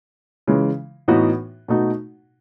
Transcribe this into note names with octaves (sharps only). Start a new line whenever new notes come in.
C#3 E3 G#3
A2 E3 B3 D#4 F#4
B2 A3 D#4 F#4